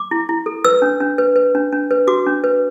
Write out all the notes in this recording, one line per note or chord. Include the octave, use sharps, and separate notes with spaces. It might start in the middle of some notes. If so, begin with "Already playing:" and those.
Already playing: D6
E4
E4
A4
B4 E6
D4
D4
B4
B4
D4
D4
B4
F#4 D6
D4
B4